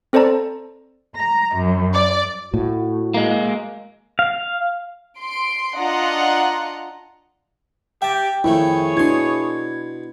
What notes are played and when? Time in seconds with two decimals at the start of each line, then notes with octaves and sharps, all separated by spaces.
0.13 C4 A4 C5 D5 A5 A#5
1.16 A#5
1.57 F#2
1.93 D5
2.54 A2 F#4
3.14 G#3 A#3
4.19 F5
5.18 C6 D7
5.75 D4 F4 D#5 F#5 A#5
8.02 G4 E5 G5 A5
8.44 F2 D#3 A3 E4 G#4 C#5
8.97 B2 D4 E4 C6 G#6